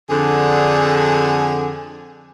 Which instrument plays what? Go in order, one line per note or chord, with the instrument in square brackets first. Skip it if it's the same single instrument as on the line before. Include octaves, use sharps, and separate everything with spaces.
[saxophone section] F2 D3 [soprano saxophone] G#4